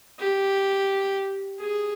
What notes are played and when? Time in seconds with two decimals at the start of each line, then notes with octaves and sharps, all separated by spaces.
0.19 G4
1.59 G#4